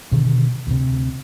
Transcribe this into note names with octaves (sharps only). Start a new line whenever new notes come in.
G2 B2 D3 D#3
D2 C3